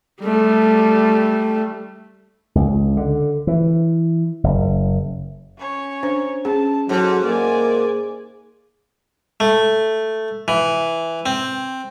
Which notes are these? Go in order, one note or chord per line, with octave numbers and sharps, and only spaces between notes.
G3 A3
C#2
D3
E3
F#1
C#4 C#5
D4 C5
C#4 G#4 A5
G#2 F#3 A4
A#3 D5 G#5
A3
E3
C4